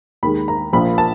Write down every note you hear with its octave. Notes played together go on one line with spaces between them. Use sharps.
D#2 D#3 G#3 B5
A#5
A#1 A#2 F3 B5
A5